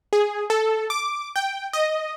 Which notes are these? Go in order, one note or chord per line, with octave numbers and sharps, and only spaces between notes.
G#4
A4
D6
G5
D#5